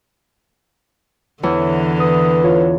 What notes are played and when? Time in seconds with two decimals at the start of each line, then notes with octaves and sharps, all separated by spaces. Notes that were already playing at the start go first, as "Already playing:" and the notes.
1.43 E2 D3 E3 C#5
2.00 B4 D#6
2.44 F4 C#5